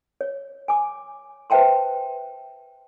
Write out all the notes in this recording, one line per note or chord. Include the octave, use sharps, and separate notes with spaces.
C#5
G#5 D6
B4 C5 E5 G5 A5 C6